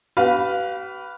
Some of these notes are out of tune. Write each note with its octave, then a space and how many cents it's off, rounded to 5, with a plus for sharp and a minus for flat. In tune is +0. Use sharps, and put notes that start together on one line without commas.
G4 -45 B4 +0 F5 +0